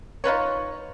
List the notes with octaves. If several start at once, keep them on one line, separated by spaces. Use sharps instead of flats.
D#4 F4 B4 C#5